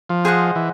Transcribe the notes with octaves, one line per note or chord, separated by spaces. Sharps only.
F3
G#4 C5 D#5 F#5
E3